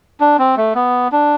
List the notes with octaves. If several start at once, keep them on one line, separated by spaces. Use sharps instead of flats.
D4
C4
A3
B3
D4